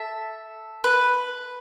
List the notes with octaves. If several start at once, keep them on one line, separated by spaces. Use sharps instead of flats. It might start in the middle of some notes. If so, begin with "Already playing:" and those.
Already playing: A4 E5
B4